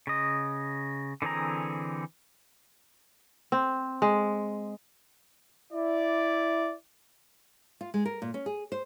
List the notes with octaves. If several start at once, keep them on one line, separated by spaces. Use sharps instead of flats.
C#3 D#5
D3 E3 C4 G#4 A#5
C4
G#3
E4 D5
F4
G#3
A#4
A#2
C#4
G#4
C5